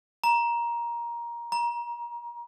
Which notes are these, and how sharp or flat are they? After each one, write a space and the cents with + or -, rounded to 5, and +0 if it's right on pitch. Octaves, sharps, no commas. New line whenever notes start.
A#5 +15
A#5 +30